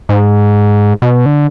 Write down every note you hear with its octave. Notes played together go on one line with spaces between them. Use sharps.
G#2
B2
D3